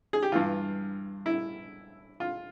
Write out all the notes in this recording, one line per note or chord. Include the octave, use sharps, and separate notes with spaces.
G#4
G4
G2 E3 F4
E4
F4